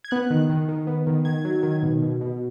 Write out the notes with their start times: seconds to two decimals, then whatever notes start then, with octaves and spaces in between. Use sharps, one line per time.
0.04 G#6
0.11 B3 F#6
0.30 D#3
0.50 D#3
0.68 D#3
0.87 B3
1.07 D#3
1.25 D#3 G#6
1.45 F#3
1.63 D#3
1.83 B2
2.02 B2
2.21 B2